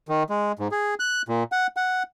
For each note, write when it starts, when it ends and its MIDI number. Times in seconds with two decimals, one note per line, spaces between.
0.09 0.23 51
0.30 0.52 56
0.59 0.68 44
0.72 0.94 68
1.00 1.22 90
1.28 1.43 46
1.52 1.67 78
1.77 2.03 78